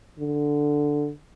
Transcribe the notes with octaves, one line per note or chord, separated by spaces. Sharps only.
D3